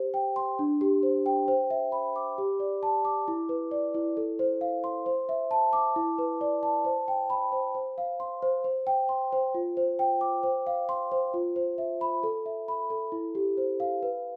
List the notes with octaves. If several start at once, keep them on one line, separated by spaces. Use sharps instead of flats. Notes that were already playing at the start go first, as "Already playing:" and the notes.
Already playing: G4 C5
G5
C6
D4
G4
C5
G5
C5
E5
B5
D6
G4
D5
A5
D6
E4
B4
D5
E4
A4
C5
F5
C6
C5
E5
A5
D6
E4
B4
D5
A5
C5
G5
B5
C5
C5
F5
C6
C5
C5
G5
C6
C5
F4
C5
G5
D6
C5
F5
C6
C5
F4
C5
E5
B5
A4
E5
B5
A4
E4
G4
C5
F5
B4